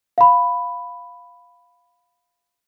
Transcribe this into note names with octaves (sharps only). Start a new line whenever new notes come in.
F5 B5